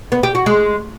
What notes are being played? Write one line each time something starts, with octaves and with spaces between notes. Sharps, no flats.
B3
G4
F#4
G#3